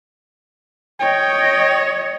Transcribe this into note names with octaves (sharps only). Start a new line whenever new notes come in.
C#5 D#5 G5